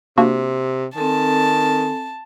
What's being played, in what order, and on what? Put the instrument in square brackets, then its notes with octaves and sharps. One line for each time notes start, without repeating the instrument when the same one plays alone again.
[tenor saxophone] C3 [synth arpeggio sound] A#3 D4 F#4
[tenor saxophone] D#3 [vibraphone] C4 A4 G#5 [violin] A5